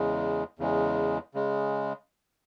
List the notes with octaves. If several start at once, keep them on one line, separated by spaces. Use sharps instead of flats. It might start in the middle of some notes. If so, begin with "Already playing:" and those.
Already playing: E2 C#3 G#3
E2 C#3 G#3
C#3 G#3